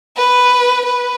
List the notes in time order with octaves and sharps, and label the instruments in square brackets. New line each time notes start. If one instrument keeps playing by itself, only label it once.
[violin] B4
B4